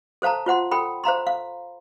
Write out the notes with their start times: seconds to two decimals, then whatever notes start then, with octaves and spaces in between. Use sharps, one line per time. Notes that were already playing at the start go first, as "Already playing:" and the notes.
0.22 A4 C5 F5 A5 A#5
0.46 F4 C5 F#5 C6
0.71 A4 G5 B5
1.04 C5 F5 A#5 C6
1.27 F5